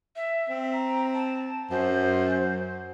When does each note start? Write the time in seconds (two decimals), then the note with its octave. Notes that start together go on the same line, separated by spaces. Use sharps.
0.16 E5
0.49 C4
0.73 A#5
1.14 A5
1.71 F#2 C5